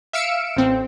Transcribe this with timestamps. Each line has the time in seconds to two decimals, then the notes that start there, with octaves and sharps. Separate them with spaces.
0.13 E5 F5 E6 C#7 D7 E7
0.57 A1 C4